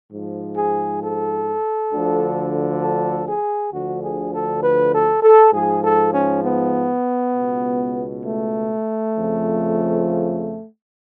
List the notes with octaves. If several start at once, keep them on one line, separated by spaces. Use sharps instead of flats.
G#2 F3
G#4
A4
D2 D3 F3
A4
G#4
D2 D3 F3 F#4
G#4
A4
B4
A4
A4
G#2 F3 G#4
A4
C#4
B3
C#2 B2
A3
F2 C#3 F3